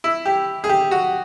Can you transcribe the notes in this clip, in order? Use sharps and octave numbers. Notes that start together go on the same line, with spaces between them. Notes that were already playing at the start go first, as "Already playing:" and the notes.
E4
G4
G#4
G4
F#4